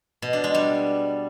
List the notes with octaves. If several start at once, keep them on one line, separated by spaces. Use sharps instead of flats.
B2
D4
G#3
G3